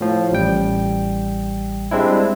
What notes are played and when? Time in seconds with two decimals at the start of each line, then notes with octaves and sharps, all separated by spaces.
0.01 A2 F3
0.32 A1 G3 G5
1.91 G3 G#3 C4 D4 E4